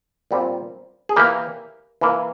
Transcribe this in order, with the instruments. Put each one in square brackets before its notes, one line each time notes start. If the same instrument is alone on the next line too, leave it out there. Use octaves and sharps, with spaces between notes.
[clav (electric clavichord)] A#2 G3 C4
G#4
E3 A#3 G4 A#4
E3 A#3